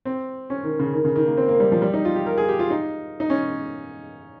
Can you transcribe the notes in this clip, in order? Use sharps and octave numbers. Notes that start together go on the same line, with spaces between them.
C4
C#4
D#3
C#3
D#3
C#3
D#3
A#3
C4
A#3
G3
F3
G3
D#4
F4
G4
A#4
G#4
G4
F4
D#4
D#4
C#4